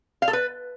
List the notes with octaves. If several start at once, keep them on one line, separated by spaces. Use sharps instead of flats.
F5
A4
B4